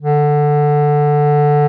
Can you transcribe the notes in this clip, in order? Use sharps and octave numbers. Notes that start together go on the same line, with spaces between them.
D3